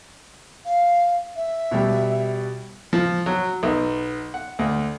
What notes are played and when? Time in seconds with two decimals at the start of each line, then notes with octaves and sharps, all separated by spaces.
0.65 F5
1.35 E5
1.71 B2 G3
2.93 F3
3.26 F#3
3.63 B1
4.34 F#5
4.59 D2